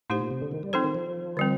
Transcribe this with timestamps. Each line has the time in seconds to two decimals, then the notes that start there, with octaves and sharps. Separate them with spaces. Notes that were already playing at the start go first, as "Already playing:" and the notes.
0.10 A2 A3 D#4 G4 C5
0.20 A#2
0.31 C3
0.42 D3
0.51 D#3
0.63 G3
0.73 F3 C4 D#4 A4 C5
0.84 D#3
0.95 F3
1.37 D3 G3 C4